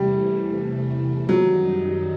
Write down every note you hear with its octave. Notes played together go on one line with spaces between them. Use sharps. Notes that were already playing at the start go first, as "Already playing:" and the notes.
Already playing: E2 C3 E3 G3 A3
F#2 D#3 F#3 G3 D#4